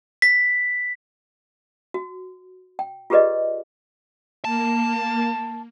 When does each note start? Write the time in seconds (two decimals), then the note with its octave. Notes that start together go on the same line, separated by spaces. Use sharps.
0.22 B6
1.94 F#4
2.79 G5
3.10 F4 G4 G#4 B4 D5 D#5
4.45 A#3 A5